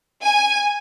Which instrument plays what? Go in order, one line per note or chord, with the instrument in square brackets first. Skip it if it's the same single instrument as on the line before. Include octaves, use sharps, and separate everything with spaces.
[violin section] G#5